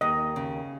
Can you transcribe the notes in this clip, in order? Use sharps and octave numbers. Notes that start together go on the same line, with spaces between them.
D#2 D#5
C#3